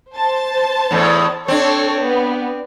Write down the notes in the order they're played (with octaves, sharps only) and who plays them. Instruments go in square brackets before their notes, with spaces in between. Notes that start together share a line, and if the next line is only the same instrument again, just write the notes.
[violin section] C5 A5
[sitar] E2 A2
[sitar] C4 D4 [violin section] A4 C#5
[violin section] B3